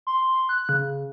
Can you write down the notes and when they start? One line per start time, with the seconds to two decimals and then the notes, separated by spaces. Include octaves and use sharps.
0.07 C6
0.49 F#6
0.69 C#3